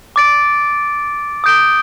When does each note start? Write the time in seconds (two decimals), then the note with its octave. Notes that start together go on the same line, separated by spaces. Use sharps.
0.16 D6 A6 D7
1.44 D#6 G6 D7 G7